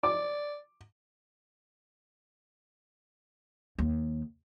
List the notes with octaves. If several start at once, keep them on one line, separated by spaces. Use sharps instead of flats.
D5 D6
D#2